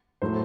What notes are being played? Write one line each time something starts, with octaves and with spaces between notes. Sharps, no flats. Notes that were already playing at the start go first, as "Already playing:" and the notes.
A2 F#3 A3 C5